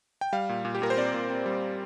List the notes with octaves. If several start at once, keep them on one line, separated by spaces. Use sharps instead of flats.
G5
G3 F5
A#2
A#2
G4
A#2 A#4
C5
C4 D5
A#2
C4
G3